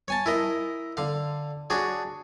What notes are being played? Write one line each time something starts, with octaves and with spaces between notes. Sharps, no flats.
C#5 G#5 A5
E4 A#4 D#5
D3 F5
D4 F#4 G#4 C#5